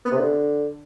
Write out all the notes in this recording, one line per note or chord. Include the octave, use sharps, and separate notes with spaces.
B3
C3
D3